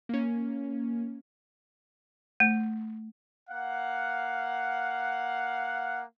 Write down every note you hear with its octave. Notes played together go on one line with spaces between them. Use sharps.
A#3 C#4
A3
A#3 F5 F#5